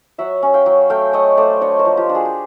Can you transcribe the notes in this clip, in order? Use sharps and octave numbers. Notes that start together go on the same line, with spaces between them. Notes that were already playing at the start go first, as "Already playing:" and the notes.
F#3 E5 F#5
C#4
F5 G5
F#3
A3 F5 G5
A3 C#5 D#5
A3 C5 D5
D4 C#5 D#5
A#4 C5
F3
F4 G4
D4
F#4 G#4
G4